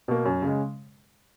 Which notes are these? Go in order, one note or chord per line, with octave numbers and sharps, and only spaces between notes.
B2 A#3
F#2
C#3 G#3